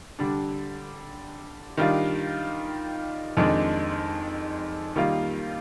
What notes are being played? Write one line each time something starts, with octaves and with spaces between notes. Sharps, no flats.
D3 G3 D4
D#3 G3 D4 F4
F2 D#3 G#3 D4
D#3 G3 A#3 F4